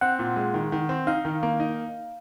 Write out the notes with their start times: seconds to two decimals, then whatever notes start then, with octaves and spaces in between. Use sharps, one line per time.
0.01 C4 F#5
0.19 A#2
0.36 G#3
0.54 D#3
0.72 D#3
0.89 C4
1.07 D#4 F5
1.25 D#3
1.43 A#3
1.60 D#4